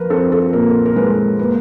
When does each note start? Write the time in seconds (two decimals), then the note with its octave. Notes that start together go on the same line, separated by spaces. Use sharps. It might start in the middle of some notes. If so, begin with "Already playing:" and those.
Already playing: F3 A#4 B4
0.10 C4 A4
0.32 A4
0.53 A#2 A#4
0.86 A#4
0.96 G#3 B4
1.39 A#3 B4